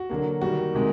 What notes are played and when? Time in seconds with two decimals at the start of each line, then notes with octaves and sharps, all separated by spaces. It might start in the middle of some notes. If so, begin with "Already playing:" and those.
Already playing: F#4
0.10 D3 F#3 A#3
0.42 D#3 G3 A#3 F#4
0.74 C3 D#3 G#3